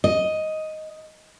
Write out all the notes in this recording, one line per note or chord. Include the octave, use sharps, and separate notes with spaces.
D#5